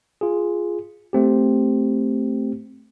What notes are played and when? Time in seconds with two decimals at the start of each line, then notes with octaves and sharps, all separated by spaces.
0.21 F4 G#4
1.13 A3 C4 G4